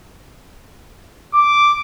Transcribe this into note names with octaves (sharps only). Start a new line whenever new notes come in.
D6